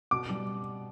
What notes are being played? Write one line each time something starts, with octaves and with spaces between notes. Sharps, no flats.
B2 D6
G3